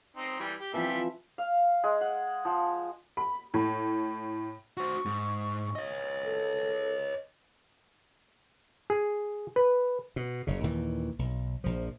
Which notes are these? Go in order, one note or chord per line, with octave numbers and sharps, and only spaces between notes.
C4 D#4
E3 G3 G5
G4
E3 F3 G3 C4 G4 E5
F5
G#3
F#5
F3
B5
A2
F#4 C5 C#6
G#2
C#5 D#5
A4
G#4
B4
B2
F#1 C#3
D#2 A#2 D#3 E3
B1
A#1 F3